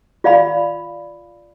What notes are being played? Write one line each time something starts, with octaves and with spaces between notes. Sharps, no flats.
F4 D5 F5 B5